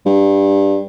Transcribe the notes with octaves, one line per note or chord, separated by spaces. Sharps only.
G2